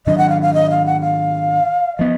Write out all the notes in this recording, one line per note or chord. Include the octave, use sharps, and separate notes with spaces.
G#2 D#3 F#3 D4 D#5
F#5
F5
F5
D#5
F5
F#5
F5
F3 B3 D#5